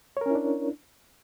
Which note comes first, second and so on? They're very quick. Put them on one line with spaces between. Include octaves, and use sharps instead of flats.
C#5 A#4 C#4 E4 D4